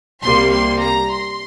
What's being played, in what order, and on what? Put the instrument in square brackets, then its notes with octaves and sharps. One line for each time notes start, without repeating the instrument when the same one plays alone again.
[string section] C2 C3 G3 A#3 C6
C6
A#5
C6